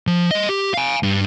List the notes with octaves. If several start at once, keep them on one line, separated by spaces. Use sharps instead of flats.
F3
D#5 C6
G4
F5 G#5
G2